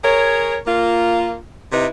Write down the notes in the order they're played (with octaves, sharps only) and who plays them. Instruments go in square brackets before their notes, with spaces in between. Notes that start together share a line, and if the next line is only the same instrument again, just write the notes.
[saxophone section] G#4 A#4 C#5
A#3 F4
C3 D#4 E4 B4